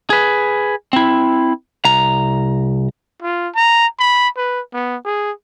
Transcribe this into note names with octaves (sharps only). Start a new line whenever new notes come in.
G#4 B4
C4 E4
C2 A#5
F4
A#5
B5
B4
B3
G#4